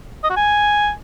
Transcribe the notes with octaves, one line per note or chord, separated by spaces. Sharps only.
D#5
F#4
G#5